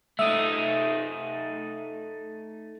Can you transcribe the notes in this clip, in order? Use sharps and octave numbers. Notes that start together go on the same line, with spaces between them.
A3 D#4 E5 D#6